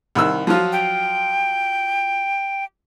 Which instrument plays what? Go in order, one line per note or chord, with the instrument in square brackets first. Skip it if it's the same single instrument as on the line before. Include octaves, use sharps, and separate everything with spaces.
[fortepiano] C2 D#3 E6
F3 F#3 F4
[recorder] G5